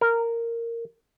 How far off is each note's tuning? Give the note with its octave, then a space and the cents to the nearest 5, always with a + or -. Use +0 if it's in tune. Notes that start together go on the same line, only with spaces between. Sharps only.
A#4 -10